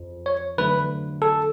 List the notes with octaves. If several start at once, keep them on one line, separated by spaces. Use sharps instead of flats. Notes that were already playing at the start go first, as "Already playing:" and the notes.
Already playing: F2
C#5
D3 F#3 A3 B4
A4